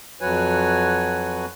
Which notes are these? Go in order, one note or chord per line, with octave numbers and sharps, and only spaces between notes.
F2 F#3 F#4 B4 C#5 G#5